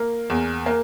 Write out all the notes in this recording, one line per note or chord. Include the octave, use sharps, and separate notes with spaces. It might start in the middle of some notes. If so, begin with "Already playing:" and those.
Already playing: A#3
E2
A#3